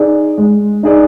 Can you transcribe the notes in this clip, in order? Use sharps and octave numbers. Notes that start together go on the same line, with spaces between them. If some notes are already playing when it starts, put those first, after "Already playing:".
Already playing: D#4 G#4 D5
G#3
D#4 G#4 D5